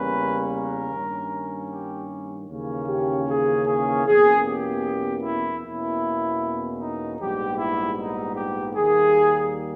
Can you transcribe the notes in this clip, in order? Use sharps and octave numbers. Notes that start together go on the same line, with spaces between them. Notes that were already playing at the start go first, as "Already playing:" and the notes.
Already playing: E2 C#3 G3 A#3 C#4 B4
A#4
G2 D#3 A#3 C#4
G4
D#2 C#3 E3 A#3 C#4
G4
G#4
G#4
E2 B2 A#3 C#4 G#4
G4
E4
E2 B2 A#3 C#4 E4
D#4
A#1 G#2 G3 B3 G4
E4
D#4
G4
D#2 D#3 G3 A#3 G#4